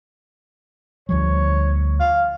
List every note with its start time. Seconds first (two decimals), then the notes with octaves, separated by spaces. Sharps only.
1.09 D2 F3 G3 C#5
2.00 F5